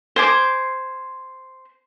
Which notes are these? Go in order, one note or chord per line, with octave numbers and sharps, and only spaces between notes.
C5 G#5 D6